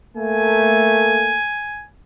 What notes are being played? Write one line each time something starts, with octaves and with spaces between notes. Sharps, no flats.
A3 A#3 G#5